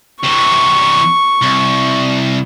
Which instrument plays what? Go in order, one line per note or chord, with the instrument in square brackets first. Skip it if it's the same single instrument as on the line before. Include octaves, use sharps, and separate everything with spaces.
[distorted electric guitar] C3 E3 [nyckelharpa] C#6
[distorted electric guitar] C2